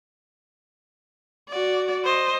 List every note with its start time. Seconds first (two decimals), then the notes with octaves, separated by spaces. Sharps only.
1.49 F#4 D5
2.04 C5 D#5